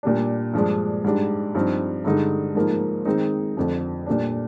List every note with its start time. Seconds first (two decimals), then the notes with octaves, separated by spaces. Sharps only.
0.03 A#2 G3 D4
0.53 G2 F3 G#3 D4
1.04 G#2 G3 D4
1.55 G2 F3 C4 D#4
2.05 G2 D3 G#3 D#4
2.55 G#2 F3 A#3 D#4
3.05 D#3 G#3 C4 D#4
3.57 F2 D3 F3
4.06 A#2 G3 D4